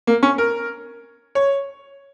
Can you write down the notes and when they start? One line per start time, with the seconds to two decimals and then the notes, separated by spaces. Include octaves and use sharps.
0.07 A#3
0.23 C#4
0.38 A#4
1.35 C#5